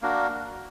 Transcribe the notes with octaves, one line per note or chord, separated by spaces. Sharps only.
A#3 D4 F#4 A#4